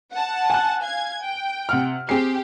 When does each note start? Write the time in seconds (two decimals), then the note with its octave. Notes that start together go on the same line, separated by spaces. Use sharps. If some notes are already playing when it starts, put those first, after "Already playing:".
0.12 F#5 A5
0.50 G#5 F#6
0.83 F5 G#6
1.21 G5
1.69 C3 F#5 F6
2.09 C4 G4 G#4 C7